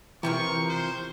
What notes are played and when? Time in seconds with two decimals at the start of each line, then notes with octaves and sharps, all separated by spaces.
0.23 C3 E3 F3 A#4 C#6
0.69 C5